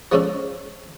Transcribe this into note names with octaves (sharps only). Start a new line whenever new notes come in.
F3 G#3 C#4 D4 A4